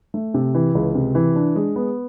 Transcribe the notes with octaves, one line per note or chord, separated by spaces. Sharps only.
A3
C3
E3
C#2
C3
E3
D4
G#3
B3